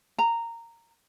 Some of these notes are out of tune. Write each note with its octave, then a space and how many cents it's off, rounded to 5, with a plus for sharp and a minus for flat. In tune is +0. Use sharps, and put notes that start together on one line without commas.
A#5 -10